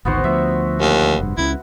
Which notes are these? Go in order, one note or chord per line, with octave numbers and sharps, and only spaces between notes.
G#1 D2 D#3 B3 F#4 C5
D2 F3 E5
D#2
F1 G2
C#2 C#3 E4